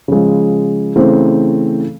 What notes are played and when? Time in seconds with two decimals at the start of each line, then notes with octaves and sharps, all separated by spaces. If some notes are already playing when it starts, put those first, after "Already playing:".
0.08 C#3 F3 G#3
0.96 C#3 E3 A3 C4